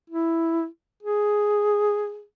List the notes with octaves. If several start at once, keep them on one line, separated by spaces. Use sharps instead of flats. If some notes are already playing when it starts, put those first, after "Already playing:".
E4
G#4